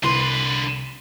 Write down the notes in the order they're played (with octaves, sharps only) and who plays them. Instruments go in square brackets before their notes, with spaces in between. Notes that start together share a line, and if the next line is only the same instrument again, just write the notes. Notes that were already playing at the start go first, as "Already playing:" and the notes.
[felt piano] C2 [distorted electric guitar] D3 B4 [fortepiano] C6